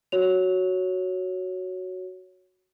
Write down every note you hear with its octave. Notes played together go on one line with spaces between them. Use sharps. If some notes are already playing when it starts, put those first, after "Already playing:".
F#4 C#5 F7